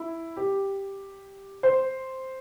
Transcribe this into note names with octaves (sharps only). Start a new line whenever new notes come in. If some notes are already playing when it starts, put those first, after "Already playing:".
Already playing: E4
G4
C5